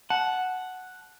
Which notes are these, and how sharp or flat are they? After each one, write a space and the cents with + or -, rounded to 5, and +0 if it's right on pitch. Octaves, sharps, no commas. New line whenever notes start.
F#5 +0 A5 -20